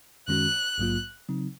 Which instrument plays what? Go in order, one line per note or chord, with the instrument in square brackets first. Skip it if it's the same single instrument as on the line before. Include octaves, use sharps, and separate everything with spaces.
[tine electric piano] F#2 D#3 G#3 C#4 F#4 [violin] F#6
[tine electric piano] A#1 G#2 F#3 A#3 F4
C#3 F#3 C4 D#4